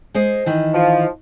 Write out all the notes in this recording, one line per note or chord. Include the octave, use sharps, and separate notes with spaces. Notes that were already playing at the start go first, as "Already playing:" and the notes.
G#3 C5 D#5
D#3 E3
F3